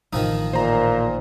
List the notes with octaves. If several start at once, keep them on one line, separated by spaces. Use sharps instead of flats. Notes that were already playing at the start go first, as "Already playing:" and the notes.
A1 D#3 F3 D#4
A#2 C5 A#5